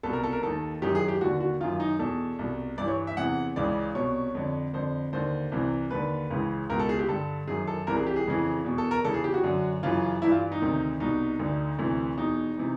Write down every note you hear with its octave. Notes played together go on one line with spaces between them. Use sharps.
C2 B2 A4
A#4
A4
A#4
D#2 D#3 A4
F#2 D#3 G4
G#4
G4
D#2 D3 F#4
F#4
F#2 D#3 F4
D#4
E2 B2 A4
C2 B2
G2 E3 D5
C#5
E5
E2 C3 E3 F#5
C#2 C#3 E3 D5
C2 B2 C#5
F2 D3
F2 D3 C5
D#2 D3 C5
C2 C3 E3
D#2 D3 B4
C#2 C#3 E3
C#2 B2 A#4
A4
G#4
G4
G2 D3 A4
F#2 D#3 G#4
A4
C2 C3 E3 A#4
G#4
G4
G#4
F2 C#3 E3
E2 B2
A4
A#4
E2 C#3 E3 A4
G#4
G4
F#4
F#2 D3
F#2 C#3 E3 F4
G2 E3 E4
F4
D#4
D2 C3 D#3
C2 B2 D#4
D2 D3
D2 C3 E3
E2 B2 D#4
C3 E3